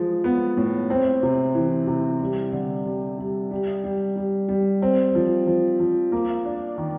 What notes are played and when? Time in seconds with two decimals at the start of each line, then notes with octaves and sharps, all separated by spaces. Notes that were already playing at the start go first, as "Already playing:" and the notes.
Already playing: F3 G#3
0.24 B3
0.57 A2
0.90 C4
1.23 C3
1.55 E3
1.87 C3
2.21 G3
2.52 D3
2.86 G3
3.18 G3
3.51 G3
3.84 G3
4.16 G3
4.48 G3
4.82 C4
5.15 F3
5.47 F3
5.80 F3
6.12 A#3
6.45 D4
6.78 D#3